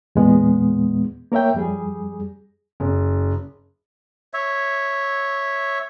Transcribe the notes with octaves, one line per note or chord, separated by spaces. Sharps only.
E2 A#2 G#3 B3
A#3 A#4 C#5 E5 G5
F2 G3 G#4
F#1
C#5 E5